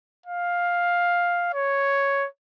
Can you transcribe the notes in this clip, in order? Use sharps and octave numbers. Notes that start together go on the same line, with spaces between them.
F5
C#5